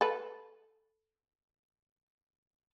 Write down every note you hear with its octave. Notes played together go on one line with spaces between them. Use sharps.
A4 B4